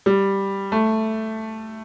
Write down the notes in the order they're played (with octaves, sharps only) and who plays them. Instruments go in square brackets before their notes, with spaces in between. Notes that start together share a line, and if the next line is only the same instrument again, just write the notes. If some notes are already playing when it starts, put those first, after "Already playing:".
[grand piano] G3
A3